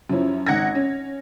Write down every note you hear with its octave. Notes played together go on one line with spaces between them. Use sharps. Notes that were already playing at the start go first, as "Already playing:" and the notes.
F#2 F3 C#4 E4
G#1 F#5 G#6 A#6
C#4